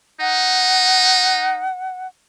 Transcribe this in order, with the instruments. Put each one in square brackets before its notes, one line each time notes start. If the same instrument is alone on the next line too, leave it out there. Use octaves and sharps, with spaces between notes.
[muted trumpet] D#4 [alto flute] F#5